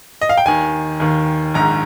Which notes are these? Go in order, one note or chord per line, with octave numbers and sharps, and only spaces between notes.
D#5
F5
G5
D#2 D#3 G#5
D#2 D#3
A#1 G#2 D#3 A#5